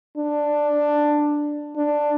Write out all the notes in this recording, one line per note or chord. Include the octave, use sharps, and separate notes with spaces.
D4
D4